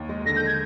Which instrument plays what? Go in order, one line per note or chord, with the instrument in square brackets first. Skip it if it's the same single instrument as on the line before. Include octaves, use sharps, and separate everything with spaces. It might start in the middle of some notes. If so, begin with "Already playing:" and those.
Already playing: [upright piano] D#2
G#3
[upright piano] D3 [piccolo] A#6
[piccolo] G6
G#6